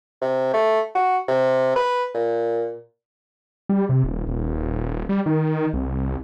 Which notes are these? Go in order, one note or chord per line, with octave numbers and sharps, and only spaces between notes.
C3
A3
F#4
C3
B4
A#2
G3
C3
D#1
D#1
G3
D#3
C2